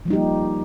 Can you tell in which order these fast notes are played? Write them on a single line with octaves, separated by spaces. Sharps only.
F3 G3 D#4 G4 A#3